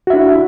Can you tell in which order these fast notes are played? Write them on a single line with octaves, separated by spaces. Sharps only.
F#4 E5 D4 E4